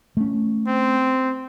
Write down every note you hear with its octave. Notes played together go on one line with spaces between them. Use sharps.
A3 C#4
C4